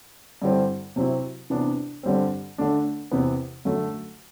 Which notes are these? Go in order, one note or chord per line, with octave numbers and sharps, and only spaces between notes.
G2 D3 G3 C4 E4
C3 F#3 C4 E4
C3 E3 B3 D4
G2 D3 G3 C4
D3 A3 D4
E2 C3 E3 B3
F#2 D3 A3